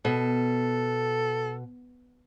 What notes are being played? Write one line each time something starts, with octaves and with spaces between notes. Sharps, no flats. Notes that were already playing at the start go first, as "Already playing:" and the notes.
B2 A4